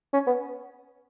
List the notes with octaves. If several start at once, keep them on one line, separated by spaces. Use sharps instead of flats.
C#4
B3